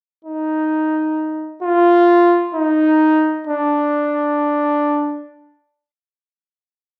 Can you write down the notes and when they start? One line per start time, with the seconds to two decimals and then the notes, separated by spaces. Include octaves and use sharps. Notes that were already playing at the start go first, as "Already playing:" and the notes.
0.25 D#4
1.63 F4
2.55 D#4
3.47 D4